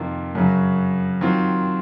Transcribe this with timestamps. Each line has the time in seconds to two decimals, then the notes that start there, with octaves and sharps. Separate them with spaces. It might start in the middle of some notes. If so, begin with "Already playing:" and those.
Already playing: F2 C3 D#3 A#3 F4
0.35 F#2 C#3 F#3
1.21 D#3 F#3 C4 F4